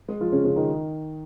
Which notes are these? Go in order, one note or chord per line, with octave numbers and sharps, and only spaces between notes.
G#3 G#4
F3 F4
C#3 C#4
C#3 C#4
D#3 D#4